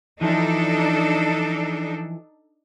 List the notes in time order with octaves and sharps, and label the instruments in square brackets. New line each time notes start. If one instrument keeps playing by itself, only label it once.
[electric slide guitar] E3 F3 [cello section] D4 D#4 A4